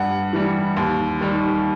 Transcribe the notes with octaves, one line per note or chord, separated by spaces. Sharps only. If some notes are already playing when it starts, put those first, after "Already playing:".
Already playing: G2 F#5
E3 G3
D#2
D#3 G3